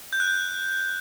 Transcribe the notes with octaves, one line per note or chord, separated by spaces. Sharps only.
G6
F#6
G6